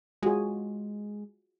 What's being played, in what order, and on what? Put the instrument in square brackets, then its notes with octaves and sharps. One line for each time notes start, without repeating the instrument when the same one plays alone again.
[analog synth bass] G#3 [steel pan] F4 F#4 G#4